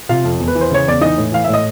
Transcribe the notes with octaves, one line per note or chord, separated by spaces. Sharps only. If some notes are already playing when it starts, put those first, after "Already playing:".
C3 F4 F5
F2
E2
B4
E3
C5
C#3 C#5
E2 D5
E3 D#4 D#5
A2
E3 F5
A2 E5
D#5